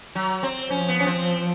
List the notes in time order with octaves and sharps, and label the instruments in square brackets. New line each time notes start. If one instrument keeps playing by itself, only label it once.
[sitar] F#3
C4
[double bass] F3 [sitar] C#4
[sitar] B3
C#4
C4